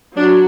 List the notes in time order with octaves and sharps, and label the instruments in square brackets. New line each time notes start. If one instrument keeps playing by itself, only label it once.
[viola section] F#3 D4